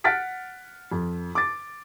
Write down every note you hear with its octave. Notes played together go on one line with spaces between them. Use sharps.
F#5 F6 A6 B6 D7
F2
D6 A6